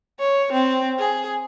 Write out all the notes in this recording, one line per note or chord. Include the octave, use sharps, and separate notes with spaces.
C#5
C4
G#4